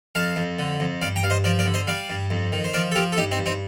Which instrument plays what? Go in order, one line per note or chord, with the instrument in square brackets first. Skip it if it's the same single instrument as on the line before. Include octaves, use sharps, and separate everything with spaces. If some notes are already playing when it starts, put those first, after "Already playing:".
[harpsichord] F2 F5 A5
F2
D3
F2
G2 D5 F5
G5 A#5
G2 F5
C5 D#5
F3 A#4 D5
A#4 D5
D3
C5 D#5
G3 D5 F5
G2
F2
D#3
C5
F3 A#4 D5
A4
F3 G4 A#4
A4
G2 D#4 G4
C4 D#4
G2
C4 D#4